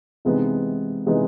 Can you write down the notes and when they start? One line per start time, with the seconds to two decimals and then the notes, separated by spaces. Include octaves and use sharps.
0.25 C3 E3 G#3 B3 D#4
1.06 C3 E3 G#3 B3 D#4